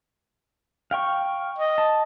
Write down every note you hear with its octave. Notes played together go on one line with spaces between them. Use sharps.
F5 G5 C#6
D#5
A5